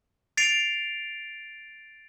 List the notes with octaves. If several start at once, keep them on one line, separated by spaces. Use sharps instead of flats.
A6 C7 D7 F7